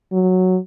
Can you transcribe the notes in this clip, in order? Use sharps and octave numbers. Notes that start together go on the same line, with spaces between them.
F#3